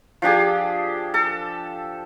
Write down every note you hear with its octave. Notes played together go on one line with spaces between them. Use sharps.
F3 D4 G4 G#4
A4